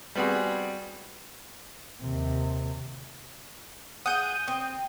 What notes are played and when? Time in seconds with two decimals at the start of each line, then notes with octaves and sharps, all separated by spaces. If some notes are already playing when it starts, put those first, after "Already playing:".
0.15 G3 B3 C4 F#4 G#4
2.02 D#2 C3
4.06 G#4 F#5 D#6 G6 D#7
4.48 C4